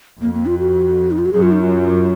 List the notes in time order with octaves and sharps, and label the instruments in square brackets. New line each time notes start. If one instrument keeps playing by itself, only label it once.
[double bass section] F2 [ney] A#3
[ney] A#3
F4
F#4
D#4
F4
F#4
[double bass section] F#2 [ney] G#4
[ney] F4
D#4
F4